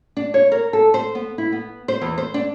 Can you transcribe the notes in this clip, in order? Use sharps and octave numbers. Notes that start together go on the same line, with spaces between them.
D4
C#5
A#4
A4
C5
B3
E4
B3
C5
E2
C5
D4